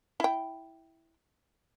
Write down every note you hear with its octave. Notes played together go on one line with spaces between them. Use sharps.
E4 G5